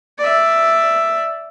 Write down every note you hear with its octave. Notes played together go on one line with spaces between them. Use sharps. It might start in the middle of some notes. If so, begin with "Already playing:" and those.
D5 E5